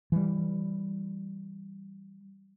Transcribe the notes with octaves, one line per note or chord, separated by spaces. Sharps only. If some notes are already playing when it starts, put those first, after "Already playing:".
E3 G3